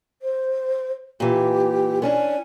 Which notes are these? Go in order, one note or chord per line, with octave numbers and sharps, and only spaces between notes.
C5
A#2 E3 G4
B3 C#4 D4 G#5